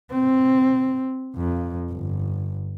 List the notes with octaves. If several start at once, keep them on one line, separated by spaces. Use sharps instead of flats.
C4
F2
G1